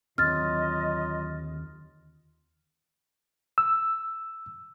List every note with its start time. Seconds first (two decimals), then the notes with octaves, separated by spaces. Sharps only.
0.18 D#2 D3 F#3 C4 F4 D#5 F6 A6
3.58 E6